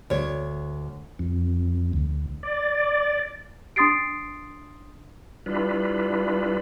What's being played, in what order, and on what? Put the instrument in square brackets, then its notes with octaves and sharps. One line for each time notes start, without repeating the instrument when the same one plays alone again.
[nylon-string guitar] D2 C#5
[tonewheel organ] F2
D2
D5
[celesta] D4 C6 D#6 A6 C7 D7
[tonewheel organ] G3 D4 E4 F4 B4